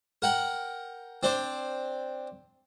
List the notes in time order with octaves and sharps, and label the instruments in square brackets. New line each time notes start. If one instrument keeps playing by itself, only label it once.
[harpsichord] A#4 F#5 G5
C4 D4 C5